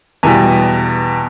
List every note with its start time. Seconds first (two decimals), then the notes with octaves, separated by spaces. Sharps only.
0.23 E2 B2 G3 G#5